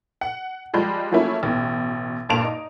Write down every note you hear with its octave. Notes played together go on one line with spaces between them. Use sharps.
F#5
F3 G3 G#3 G6
F3 F#3 A3 A#3 C#4 E4
A1 B2
G2 A#2 F5 A5 D7 F7
D#4